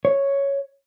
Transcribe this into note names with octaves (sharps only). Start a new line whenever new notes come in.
C#5